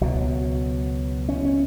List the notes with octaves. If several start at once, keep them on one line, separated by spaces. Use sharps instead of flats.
C#2 B2 F#3
C#4
C#4